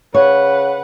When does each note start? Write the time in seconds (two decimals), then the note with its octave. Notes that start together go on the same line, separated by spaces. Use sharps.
0.14 C#3 B4 C#5 F#5